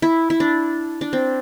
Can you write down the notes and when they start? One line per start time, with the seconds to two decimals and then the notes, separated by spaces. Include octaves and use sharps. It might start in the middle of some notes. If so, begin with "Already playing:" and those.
0.02 E4
0.30 E4
0.40 D4
1.01 D4
1.13 C4